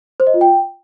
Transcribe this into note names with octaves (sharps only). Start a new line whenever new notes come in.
C5
D#5
F4
G5